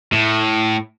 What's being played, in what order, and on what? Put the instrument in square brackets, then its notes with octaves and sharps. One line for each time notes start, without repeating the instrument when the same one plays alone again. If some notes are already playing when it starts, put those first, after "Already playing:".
[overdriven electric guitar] A2